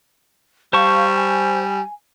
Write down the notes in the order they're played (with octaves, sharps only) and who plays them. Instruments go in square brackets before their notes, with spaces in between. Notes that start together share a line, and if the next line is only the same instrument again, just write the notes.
[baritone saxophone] G3 [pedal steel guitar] C5 A5 C#6 [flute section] F5
[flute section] G#5